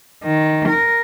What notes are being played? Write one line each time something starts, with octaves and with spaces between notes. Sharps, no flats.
D#3
A#4